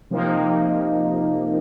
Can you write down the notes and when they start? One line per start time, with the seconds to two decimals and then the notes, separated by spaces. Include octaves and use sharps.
0.10 C3 F3 A#3 D#4